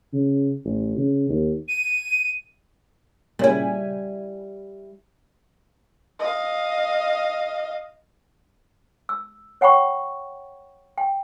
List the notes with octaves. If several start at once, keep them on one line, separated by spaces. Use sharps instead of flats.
C#3
A1
C#3
D#2
D#7
A#2 C#3 G3 E4 G#5
D#5 F5
E6
C#5 F#5 G5 B5 C#6
G5